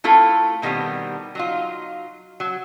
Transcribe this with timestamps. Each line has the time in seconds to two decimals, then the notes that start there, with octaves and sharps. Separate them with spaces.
0.04 A3 E4 F4 A4
0.62 B2 D#3 G3 B3 C4
1.35 F#3 D#4 F4
2.40 F#3